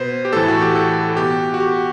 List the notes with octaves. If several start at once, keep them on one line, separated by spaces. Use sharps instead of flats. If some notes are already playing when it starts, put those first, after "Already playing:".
Already playing: B2 B4 C5
G4
A2 E3 A4
F#4
G4
A4
B2 G4
F#4
G4